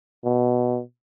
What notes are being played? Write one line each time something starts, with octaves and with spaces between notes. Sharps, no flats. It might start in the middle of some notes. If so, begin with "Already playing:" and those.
B2